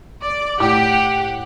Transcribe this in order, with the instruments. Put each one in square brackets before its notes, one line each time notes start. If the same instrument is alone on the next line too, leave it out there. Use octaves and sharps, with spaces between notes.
[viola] D5 D6
[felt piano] A2 D6 [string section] G4 [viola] F#5